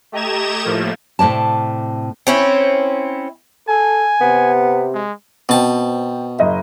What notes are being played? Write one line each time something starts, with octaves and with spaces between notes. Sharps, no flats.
A3 G4 D#5 A#5 G#6 E7
A2 F3 A3 A#3
A2 C3 D5 A5
C4 C#4 E4
A4 G#5
C3 B3
G#3
B2 C4 C5 G5 A5
F#1 D#5 E5